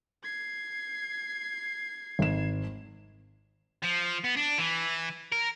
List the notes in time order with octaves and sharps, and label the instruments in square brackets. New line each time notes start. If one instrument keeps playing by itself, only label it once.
[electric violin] G#6 C7
[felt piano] G#1 E7
[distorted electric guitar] F3
B3
D4
E3
A#4